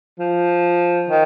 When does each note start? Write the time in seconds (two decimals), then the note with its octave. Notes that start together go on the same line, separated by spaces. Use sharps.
0.19 F3
1.10 D#3